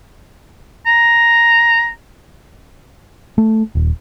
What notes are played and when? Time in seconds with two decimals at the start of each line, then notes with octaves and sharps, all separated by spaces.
0.86 A#5
3.38 A3
3.75 D#1